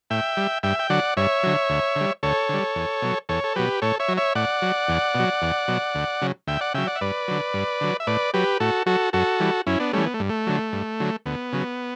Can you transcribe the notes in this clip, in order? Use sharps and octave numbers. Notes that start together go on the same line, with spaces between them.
A2 E5 G5
G3
G2 E5 G5
G5
D3 F#3 D5 F#5
G2 C#5 E5
D3 F#3
D2
D3 G3
D2 A4 C#5
D3 G3
E2
B2 F#3
E2 A4 C#5
A4
B2 F#3 G4 B4
A2 A4 C#5
C#5 E5
F#3
C#5 E5
A2 D5 F#5
F#3
E2
B2 F#3
E2
B2 F#3
D2
C#3 F#3
D2 E5 G5
D5 F#5
C#3 F#3 E5 G5
D5 F#5
E5
G2 B4 D5
D3 F#3
G2
D3 F#3
E5
A2 B4 D5
F#3 G4 B4
A2 F#4 A4
F#3 F#4 A4
F#2 F#4 A4
E3 G3
F#2 C#4 E4
B3 D4
E3 G3 A3 C#4
B3
A3
G2
A3
D3 F#3
G2
D3 F#3
D2 B3
C#3 F#3